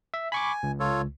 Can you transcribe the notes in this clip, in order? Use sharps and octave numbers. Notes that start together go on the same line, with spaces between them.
E5
G#5 B5 C#6 D6
C#2
F4 A4 C#5